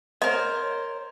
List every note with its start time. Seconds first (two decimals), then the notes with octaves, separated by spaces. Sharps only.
0.22 A#4 C5 C#5 D#5